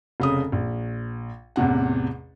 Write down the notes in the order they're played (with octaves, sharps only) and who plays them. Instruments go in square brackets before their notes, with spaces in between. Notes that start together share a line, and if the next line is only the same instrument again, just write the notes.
[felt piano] F1 C#3 D#6
A#1
A1 E2 C3 F#5